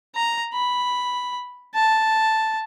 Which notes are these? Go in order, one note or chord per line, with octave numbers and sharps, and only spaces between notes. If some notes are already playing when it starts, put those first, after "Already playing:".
A#5
B5
A5